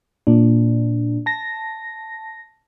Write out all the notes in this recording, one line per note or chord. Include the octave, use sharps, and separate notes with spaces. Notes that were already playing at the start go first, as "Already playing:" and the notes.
A#2 D4
A5 A#6